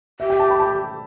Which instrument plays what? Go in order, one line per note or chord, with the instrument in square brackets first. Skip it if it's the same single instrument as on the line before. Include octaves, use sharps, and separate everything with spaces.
[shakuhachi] G4 [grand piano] E5
[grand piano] G5
A5
B5
A5